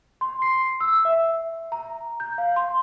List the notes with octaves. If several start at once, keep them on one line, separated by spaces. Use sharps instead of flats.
C6
C7
E6
E5
A#5
G6
F5
C6